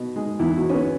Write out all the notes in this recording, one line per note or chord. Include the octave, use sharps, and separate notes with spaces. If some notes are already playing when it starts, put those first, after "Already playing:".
Already playing: B2
G#3
E2 E4
B2 F#4
C#4
B3